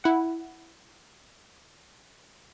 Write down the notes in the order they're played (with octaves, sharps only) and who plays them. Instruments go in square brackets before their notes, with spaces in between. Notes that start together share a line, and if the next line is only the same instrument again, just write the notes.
[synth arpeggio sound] E4 F#5